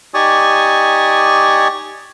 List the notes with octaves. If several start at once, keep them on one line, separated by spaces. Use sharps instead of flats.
D#4 G4 D5 G#5 C#6 D#6